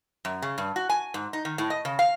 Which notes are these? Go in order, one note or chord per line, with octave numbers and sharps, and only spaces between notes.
F#2
C#3
G2
F#4
G#5
G#2
D#4
D#3
A2
D#5
C#3
F5